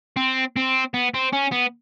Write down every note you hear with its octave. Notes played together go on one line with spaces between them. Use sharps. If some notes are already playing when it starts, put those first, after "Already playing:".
C4
C4
B3
C4
C#4
B3